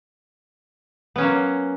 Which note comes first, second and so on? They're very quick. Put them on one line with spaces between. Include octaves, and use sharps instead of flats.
B3 C#4 F#3 A#3